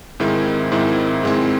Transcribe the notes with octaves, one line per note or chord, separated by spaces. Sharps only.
G#2 D#3 G#3 C4 E4
G#2 D#3 G#3 C4 E4
G#2 D#3 G#3 C4 E4